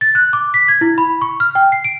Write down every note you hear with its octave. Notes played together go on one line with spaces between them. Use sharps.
A6
F#6
D6
B6
G#6
E4
B5
C#6
F6
G5
C7
D7